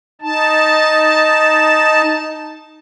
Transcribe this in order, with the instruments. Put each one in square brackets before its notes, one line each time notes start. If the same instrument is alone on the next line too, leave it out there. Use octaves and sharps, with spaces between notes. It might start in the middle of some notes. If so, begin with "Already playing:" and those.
[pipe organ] D#4 A5